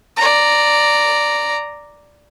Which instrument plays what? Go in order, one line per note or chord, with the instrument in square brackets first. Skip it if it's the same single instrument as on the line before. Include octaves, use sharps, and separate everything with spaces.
[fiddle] D5 A#5